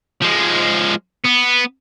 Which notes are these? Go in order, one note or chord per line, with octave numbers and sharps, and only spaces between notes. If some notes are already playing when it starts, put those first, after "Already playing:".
F3 G#3
B3